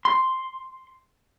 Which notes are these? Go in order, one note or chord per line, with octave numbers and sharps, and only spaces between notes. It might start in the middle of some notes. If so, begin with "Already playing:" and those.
C6